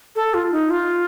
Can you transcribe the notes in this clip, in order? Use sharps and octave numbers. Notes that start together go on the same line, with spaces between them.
A4
F4
D#4
F4